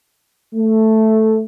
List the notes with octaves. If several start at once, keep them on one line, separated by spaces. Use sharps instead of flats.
A3